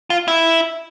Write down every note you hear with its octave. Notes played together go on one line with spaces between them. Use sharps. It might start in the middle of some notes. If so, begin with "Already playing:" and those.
F4
E4